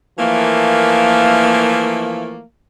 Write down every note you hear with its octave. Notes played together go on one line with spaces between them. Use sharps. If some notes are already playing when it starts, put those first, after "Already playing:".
E3 F3 A3 A#3